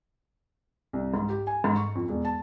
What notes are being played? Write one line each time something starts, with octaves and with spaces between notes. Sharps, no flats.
C2
G#2
G4
G#5
G#2
C#6
F2
E1
A5